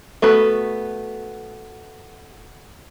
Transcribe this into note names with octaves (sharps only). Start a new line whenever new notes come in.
A3 B3 F#4 B4